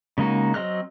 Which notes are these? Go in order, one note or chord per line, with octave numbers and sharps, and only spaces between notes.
C#3 G#3 A#3 D#4 F#4
F#3 C4 D#5 F6 F#6